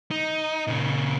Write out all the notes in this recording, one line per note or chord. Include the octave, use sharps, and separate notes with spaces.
D#4
A#2 C#3